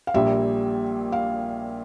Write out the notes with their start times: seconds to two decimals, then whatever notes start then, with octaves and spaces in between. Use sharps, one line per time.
0.07 F5
0.14 A#1 A#2 G3 E5
1.12 F5